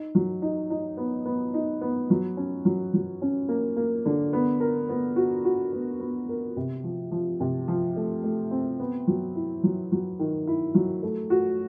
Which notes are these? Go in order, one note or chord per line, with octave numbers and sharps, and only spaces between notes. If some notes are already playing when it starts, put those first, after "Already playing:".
Already playing: D#4
F#3
D#4
D#4
B3
B3
D#4
B3
F#3
C#4
F#3
F#3
C#4
A#3
A#3
D3
B3
A#4
B3
F#4
F#4
B3
B3
A#4
C3
F3
F3
C3
F3
A3
A3
C4
B3
F#3
E4
F#3
F#3
D#3
E4
F#3
A3
F#4